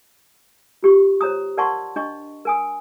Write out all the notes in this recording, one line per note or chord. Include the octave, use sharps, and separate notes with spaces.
F4 G4 C#6
C5 C#5 A#5 D#6
A#4 D5 F#5 A5 C6 C#6
D4 D#5 C#6
A#4 G#5 D#6